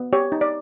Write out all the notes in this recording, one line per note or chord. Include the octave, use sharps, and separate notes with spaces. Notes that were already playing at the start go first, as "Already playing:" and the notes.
Already playing: B3
G4 C#5
D#4
D5